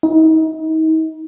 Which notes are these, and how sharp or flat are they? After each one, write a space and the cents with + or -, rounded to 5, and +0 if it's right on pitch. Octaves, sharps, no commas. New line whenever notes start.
D#4 +35